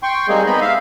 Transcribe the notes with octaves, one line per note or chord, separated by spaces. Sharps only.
G5 C6 C#6
G3 G#3 A#3 C4 D#4 G#4
B3 C4 D#4 D#5 B5
E5 F5